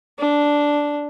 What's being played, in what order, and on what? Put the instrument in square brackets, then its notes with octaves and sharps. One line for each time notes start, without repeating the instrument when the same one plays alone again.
[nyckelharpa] D4